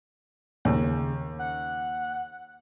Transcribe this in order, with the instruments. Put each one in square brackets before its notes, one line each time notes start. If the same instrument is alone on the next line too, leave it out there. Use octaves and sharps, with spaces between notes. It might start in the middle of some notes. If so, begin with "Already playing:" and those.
[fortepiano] D#2 [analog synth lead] C#3
[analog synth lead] F#5